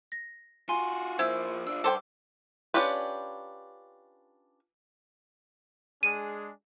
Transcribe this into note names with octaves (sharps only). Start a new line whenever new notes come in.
A#6
F4 F#4 G#5 C6
F3 A#3 E4 C5 E6
D4 F4 E6
G2 A4 C5 G5 D6 E6
C#4 D4 F4 G4 B4
G#3 D4 G#4 D#7